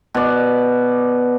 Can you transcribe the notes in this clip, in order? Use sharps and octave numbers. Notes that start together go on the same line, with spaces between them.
B2 D5